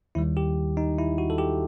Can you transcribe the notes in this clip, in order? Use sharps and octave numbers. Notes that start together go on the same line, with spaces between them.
D#2 D#3 G3 E4
G4
D#4
E4
F#4
A4
G4